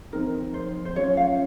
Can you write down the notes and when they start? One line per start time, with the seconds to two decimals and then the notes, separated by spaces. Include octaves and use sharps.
0.13 F3 C4 D#4 A#4
0.54 C5
0.85 C5
0.96 F#3 C#4 F4 C#5
1.17 F5